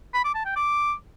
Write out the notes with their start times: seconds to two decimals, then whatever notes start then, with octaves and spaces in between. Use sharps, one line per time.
0.14 B5
0.24 D6
0.35 A5
0.45 G5
0.56 D6